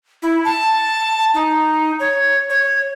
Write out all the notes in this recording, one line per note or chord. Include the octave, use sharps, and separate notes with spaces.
E4
A5
D#4
C#5
C#5